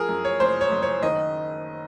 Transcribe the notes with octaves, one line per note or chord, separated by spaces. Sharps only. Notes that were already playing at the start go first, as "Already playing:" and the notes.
Already playing: F3 G#4 A#4
F#2
C#5
F#1 C5
C#5
F#1
C#5
D#3 D#5